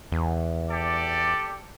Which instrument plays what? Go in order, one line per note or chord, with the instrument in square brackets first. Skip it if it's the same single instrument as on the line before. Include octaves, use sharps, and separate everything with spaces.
[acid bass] E2
[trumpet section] G4 A4 D5